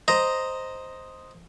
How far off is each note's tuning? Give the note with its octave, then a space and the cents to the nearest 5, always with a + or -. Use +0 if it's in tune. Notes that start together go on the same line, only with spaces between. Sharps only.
C5 +0 D#5 +0 A#5 +0